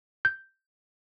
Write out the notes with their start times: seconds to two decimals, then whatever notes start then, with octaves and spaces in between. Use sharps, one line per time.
0.25 G6